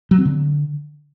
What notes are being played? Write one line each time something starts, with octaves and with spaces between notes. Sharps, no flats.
F#3
C4
D3